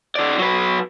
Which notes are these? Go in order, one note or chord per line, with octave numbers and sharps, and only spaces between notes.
D#3 D5
F#3 B4